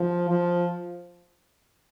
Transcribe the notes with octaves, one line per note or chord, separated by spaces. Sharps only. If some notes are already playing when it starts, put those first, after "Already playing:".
Already playing: F3
F3